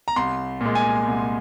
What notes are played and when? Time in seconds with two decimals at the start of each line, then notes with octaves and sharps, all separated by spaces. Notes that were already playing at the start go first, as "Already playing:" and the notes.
0.08 A#5
0.16 C2 C6
0.61 A#2 G#3
0.75 G#5
1.06 C2